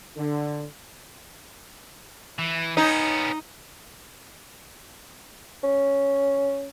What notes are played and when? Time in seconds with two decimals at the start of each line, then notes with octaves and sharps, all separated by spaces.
0.17 D3
2.39 E3
2.77 B3 C#4 D#4
5.64 C#4